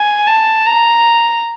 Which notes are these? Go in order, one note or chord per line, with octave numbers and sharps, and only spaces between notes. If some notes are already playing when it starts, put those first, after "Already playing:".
Already playing: G#5
A5
A#5